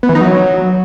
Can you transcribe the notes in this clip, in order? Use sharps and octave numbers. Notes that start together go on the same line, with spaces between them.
B3
E3
D#4
F#3